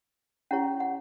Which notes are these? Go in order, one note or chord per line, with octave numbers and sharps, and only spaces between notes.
C#4 E4 G4 C#5 F#5
F#5